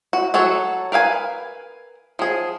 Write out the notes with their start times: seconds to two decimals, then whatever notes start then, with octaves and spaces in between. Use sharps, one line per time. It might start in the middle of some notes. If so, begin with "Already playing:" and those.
0.13 F#4
0.34 F#3 F#4 A4 C#5
0.92 A#4 B4 F5 G#5
2.19 F3 G#4